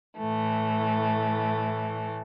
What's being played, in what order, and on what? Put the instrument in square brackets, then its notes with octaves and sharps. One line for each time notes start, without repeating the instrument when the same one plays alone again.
[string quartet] A2 E3 A3